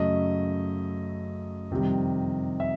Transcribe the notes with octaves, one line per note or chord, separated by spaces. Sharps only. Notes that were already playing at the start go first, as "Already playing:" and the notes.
Already playing: F#2 C#3 F#3 A3 D#5
F2 C3 D#3 G3
E5